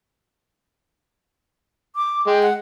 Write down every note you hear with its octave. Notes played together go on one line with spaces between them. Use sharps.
D6
G#3 G5
F#5